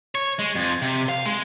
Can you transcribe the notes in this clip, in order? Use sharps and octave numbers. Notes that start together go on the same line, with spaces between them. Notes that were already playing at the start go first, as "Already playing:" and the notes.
C#5
G#3
F2
C3
F5
G#3